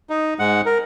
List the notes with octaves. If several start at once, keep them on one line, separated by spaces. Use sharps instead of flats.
D#4
G#2 G#3 F#5
A#4